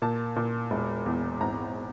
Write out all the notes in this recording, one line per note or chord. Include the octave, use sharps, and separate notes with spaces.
A#2 A5
A#2
E1
E2
G#1 A#5